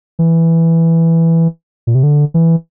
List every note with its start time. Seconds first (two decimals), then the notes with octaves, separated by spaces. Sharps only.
0.19 E3
1.87 A#2
1.95 C3
2.03 D3
2.34 E3